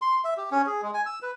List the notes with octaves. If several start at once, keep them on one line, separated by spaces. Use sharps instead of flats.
C6
E5
G4
C#4
G#4
G#3
G#5
E6
B4